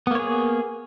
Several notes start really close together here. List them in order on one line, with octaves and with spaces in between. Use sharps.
B3 A#3 C#5 G#4